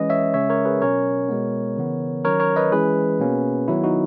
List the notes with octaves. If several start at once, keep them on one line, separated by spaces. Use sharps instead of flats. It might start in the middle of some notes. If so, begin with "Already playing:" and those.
Already playing: E3 G#3 C#4 B4 D#5
C#5 E5
C#3 G#3 C#4 C#5 E5
A#4 C#5
G#4 B4
B2 F#3 C#4 A#4 C#5
B2 G#3 B3
C#3 E3 B3
D#3 F#3 C#4 A#4 C#5
A#4 C#5
B4 D#5
E3 G#3 C#4 G#4 B4
B2 A#3 C#4
D#3 F#3 B3 E4
D#4 F#4